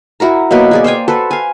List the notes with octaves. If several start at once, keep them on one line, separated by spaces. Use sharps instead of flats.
E4 F#4 A#4 A#5
B2 F#3 A#3 B4
F#4 G#4 D5
C5 F5 G5 G#5
F#4 A4 B4 C5
F5 G#5